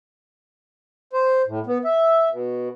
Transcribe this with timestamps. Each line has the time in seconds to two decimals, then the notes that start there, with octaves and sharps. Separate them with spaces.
1.13 C5
1.47 A2
1.66 B3
1.84 E5
2.31 B2